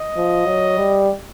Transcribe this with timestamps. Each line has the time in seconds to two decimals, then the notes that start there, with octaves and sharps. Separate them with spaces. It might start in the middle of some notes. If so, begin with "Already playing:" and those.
Already playing: D#5
0.17 F3
0.46 F#3
0.78 G3